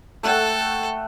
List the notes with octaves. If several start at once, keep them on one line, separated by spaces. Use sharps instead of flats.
A3 A4 F#5 G5